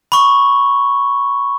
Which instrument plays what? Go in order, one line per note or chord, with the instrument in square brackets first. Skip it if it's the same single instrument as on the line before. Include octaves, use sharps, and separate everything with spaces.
[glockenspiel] B5 C#6